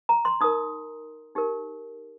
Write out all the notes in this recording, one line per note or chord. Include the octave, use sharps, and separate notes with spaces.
A#5
C6
D#4 A#4 D#6
D#4 G4 A#4